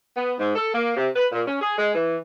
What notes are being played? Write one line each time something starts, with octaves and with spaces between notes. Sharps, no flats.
B3
G#2
A4
A#3
C3
B4
A#2
C#4
G#4
G#3
E3